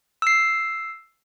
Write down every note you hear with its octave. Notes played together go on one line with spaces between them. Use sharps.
E6 C7